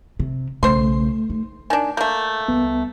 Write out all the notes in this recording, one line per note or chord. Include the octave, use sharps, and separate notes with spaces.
C3
B1 C#3 A3 C5 C6
D#4
D#3 D4 G#5
A3 A#3 G6
C2 B3